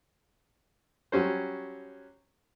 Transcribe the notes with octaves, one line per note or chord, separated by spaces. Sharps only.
F#3 G3 C#4 C5